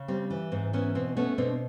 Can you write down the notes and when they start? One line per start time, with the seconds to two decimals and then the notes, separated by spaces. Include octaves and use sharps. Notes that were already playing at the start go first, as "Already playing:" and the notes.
Already playing: C#3
0.08 G3 C4
0.30 E3
0.52 G#2 C4
0.73 E3 B3 C#4
0.95 B2 C4
1.17 A3 B3 C#4
1.38 B2 C4 D4